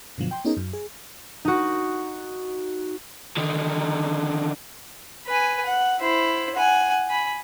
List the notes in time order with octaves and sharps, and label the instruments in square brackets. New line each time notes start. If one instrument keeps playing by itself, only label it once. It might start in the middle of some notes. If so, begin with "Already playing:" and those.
[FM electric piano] G2 B2 D3 F3 F#3
G5 C6
B3 C#4 D#4 G#4 A#4
F#2
G#4
[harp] D#4 F#4
[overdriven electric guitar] D3 D#3
[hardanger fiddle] B4 G#5
F#5
E4 C5
F#5 G#5
G#5 B5